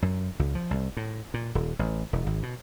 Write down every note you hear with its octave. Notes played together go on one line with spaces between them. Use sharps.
F#2
C#2
F3
C2
A2
A#2
D#1
A1
E1
G#1
B2